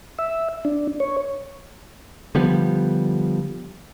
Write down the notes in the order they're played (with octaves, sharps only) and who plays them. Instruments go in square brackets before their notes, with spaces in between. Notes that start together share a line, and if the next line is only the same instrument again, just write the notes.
[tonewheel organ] E5
D4
C#5
[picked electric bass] D3 F3 G3 B3